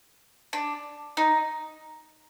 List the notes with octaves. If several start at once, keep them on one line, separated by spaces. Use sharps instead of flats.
D4
D#4